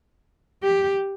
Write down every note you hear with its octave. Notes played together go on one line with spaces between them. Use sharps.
G4